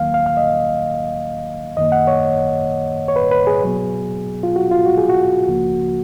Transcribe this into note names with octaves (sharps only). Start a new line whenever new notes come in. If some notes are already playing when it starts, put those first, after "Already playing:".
Already playing: D#2 D#3 F#3 A#3 F5
F5
F5
D#5
F#2 D#3 A#3 D#5
F#5
C#5
C#5
B4
B4
G#4
B2 F#3 B3
F4
F#4
F4
F#4
G#4
F#4
C#2 C#3 F3 A#3